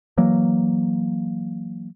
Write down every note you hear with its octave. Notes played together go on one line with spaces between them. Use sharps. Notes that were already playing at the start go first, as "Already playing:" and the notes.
E3 F#3 A#3